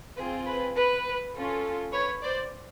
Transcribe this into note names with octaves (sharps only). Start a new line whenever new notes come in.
C4 F4 G#4 B4
B4
B4
C#4 F4 A4
B4 C#5
C5 D5